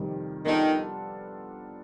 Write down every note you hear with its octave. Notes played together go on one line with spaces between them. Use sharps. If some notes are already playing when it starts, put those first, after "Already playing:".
Already playing: F2 C3 D#3 G3
D#3 G3 B3 D4 F4 A4